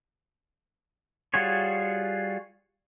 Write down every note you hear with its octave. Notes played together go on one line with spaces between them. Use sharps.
G3 F4 F#4 G#4 C#5